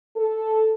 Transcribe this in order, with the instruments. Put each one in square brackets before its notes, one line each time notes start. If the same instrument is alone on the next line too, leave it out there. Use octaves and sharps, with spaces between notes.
[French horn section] A4